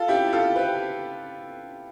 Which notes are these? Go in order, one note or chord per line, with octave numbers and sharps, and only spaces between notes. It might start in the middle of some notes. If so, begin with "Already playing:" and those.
Already playing: F4 A4
E4 G4
F4 A4
G4 B4